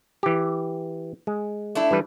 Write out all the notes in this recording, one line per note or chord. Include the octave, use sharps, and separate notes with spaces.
E3 G4
G#3
A3 D4 E4
E3 G3 B4